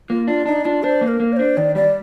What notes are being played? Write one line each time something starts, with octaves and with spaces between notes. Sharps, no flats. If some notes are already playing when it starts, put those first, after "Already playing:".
A#3 F4
D4 F4
D4 D#4
D4 F4
D4 C5
A#3
A#4
A#3
D5
D4 C5
D#3 D5
G3 D5